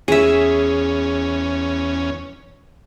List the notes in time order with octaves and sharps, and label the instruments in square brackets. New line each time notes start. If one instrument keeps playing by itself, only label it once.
[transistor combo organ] E2 C#4 [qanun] G#4 E5